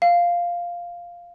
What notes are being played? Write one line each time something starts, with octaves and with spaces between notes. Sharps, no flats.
F5